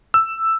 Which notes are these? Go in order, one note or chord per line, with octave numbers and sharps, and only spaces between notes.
E6